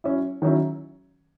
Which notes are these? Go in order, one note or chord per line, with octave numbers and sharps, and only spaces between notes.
F#3 C#4 E4
D#3 F#3 C#4 E4